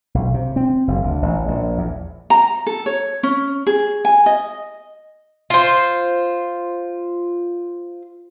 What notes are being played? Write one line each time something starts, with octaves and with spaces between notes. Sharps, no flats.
B1
C3
C4
F#1
D2
A1
A#1
E2
A#5
A4
C#5
C#4
G#4
G#5
D#5
F4 C5